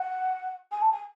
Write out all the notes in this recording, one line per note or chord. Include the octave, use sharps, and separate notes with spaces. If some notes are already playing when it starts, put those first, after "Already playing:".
Already playing: F#5
G#5
A5
G#5